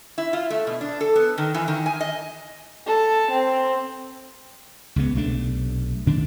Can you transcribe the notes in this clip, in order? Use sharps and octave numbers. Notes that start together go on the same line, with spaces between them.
E4
F4
A3
B2
D4
A4
B3
D#3
E3
D#3
G#5
D#5
A4
C4
C#2 C#3 B3
B1 C3 A3 D4
D2 A2 D#3 D4